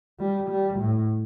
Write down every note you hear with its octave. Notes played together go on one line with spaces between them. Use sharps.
G3
G3
A2